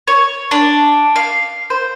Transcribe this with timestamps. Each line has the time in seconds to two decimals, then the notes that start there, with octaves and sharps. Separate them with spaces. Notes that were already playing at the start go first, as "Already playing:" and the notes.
0.08 C#5
0.51 D4
1.16 F5
1.70 C5